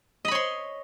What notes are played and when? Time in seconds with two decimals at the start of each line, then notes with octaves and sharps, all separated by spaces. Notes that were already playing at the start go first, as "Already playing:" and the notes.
0.25 D#5
0.28 B5
0.31 C#5
0.35 C6